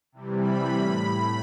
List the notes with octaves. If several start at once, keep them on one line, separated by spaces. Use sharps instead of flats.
C3 E3 G3
B5
A2 B5